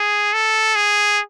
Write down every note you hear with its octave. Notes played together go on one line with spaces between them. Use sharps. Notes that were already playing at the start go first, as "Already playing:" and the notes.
Already playing: G#4
A4
G#4